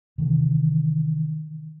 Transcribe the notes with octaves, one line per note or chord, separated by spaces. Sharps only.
C3 D#3 E3